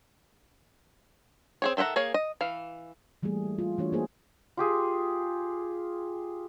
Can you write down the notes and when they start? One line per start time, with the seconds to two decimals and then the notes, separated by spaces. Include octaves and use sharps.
1.62 C4 G#4 C#5
1.77 D#3 A4 E5 F#5 A#5
1.96 A#3 G#4 C#5 F5
2.14 D#5
2.41 E3 F5
3.23 E3 G3 A3 A#3 G#4
3.59 F4
3.78 E3 A3 D4 F#4 C#5
3.92 A#3 D#4 G4 G#4 A#4 C5
4.57 F4 G4 G#4